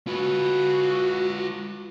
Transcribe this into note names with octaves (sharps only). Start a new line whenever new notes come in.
F4 F#4 B4